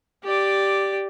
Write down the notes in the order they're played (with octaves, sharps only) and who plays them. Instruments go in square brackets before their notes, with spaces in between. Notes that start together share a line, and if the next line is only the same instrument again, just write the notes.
[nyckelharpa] G4 D5